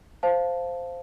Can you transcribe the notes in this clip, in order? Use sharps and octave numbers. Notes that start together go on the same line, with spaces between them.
C5 F5 A5